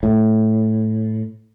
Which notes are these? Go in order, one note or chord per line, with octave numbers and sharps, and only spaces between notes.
A2